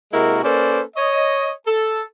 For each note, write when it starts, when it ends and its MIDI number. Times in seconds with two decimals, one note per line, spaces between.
0.13 0.40 48
0.13 0.40 56
0.13 0.40 58
0.13 0.40 64
0.13 0.40 66
0.13 0.40 70
0.44 0.81 58
0.44 0.81 61
0.44 0.81 69
0.44 0.81 71
0.44 0.81 72
0.44 0.81 74
0.96 1.51 73
0.96 1.51 75
1.67 2.03 69